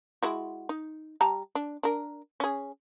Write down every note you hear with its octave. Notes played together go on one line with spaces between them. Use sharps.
G#3 E4 F#4
D#4
G3 A5 A#5
D4
D4 A#4
C#4 G#4